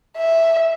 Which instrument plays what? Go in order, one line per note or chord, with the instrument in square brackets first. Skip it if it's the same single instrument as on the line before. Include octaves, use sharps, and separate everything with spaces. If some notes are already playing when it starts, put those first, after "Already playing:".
[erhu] E5